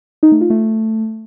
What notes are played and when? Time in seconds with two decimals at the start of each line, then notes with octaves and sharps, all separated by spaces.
0.23 D#4
0.32 A3
0.41 F4
0.50 A3